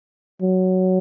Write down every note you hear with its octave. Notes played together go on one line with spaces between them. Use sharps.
F#3